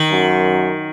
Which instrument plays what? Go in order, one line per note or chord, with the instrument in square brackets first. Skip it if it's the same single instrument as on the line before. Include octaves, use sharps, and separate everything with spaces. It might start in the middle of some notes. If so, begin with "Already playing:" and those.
Already playing: [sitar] D#3
[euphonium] F#2